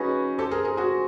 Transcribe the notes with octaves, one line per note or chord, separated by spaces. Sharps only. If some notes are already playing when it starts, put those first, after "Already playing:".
Already playing: C#4 D#4 F#4 G#4 B4
G4 A4 C5
G#4 A#4
G#4 A#4
F#4 G#4